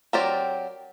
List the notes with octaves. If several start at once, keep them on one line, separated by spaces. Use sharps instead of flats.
F#3 C4 G4 A#4 D5